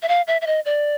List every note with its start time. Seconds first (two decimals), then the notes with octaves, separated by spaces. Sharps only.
0.02 E5
0.08 F5
0.27 E5
0.41 E5
0.47 D#5
0.65 D5